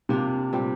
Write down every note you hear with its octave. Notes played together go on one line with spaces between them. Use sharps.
C3 A#3 D4 F4
A#2 G3 C4 G4